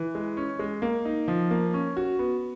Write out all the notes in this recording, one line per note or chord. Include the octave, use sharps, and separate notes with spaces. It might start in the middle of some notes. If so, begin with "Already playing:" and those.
Already playing: E3
G#3
C#4
G#3
A#3
D#4
F3
A#3
C#4
F#4
B3